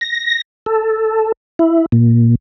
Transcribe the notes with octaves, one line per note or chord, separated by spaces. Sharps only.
A#6
A4
E4
A#2